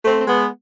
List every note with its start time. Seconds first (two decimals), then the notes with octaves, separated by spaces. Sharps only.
0.05 A3 C4
0.18 C4
0.28 G#3 B3